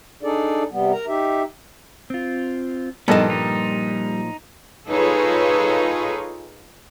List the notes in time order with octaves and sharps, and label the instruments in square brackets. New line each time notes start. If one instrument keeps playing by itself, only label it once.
[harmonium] D4 D#4 G#4 A4 D5
C3 G3 B3
A#4 A#5
D#4 G4 E5
[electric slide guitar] C4 F4
[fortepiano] G2 A4 D#5 [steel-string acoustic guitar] A#2 F3 [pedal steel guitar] B3 A5 [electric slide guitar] D#4
[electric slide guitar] G3 [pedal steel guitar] D#4
[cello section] D#4 F4 G#4 A4 B4 C#5